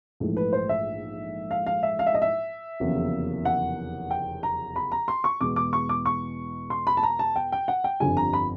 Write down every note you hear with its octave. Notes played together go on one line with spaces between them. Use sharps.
A#1 G#2 E3 A3
B4
C5
E5
F5
F5
E5
F5
E5
D#5
E5
F1 E2 C#3 F#3 A#3
F#5
G5
A#5
B5
A#5
C6
C#6
E2 B2 G#3 B3 D6
D6
C#6
D6
C#6
C6
B5
A5
A#5
A5
G5
G5
F#5
G5
G1 F2 D3 G3 G#5
A#5
B5